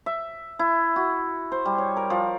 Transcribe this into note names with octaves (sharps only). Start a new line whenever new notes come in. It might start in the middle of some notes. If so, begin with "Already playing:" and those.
E5
E4
F#4
C5
G3
C#5
A#4
F3